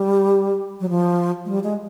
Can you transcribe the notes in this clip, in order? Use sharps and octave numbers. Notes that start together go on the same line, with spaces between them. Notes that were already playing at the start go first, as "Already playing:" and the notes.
Already playing: G3
F#3
F3
G#3
G3
G#3